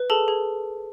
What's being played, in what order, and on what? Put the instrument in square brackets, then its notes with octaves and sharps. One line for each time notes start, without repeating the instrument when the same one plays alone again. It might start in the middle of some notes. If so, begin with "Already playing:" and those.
Already playing: [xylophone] B4
G#4 A4 A5
G#4